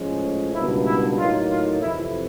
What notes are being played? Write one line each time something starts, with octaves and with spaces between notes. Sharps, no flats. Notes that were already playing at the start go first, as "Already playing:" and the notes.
Already playing: A2 F3 G#3 C#4
C#2 B2 G3 A#3 D4 E4
E4
A2 F#3 A#3 D#4 F4
F4
F2 C3 E3 E4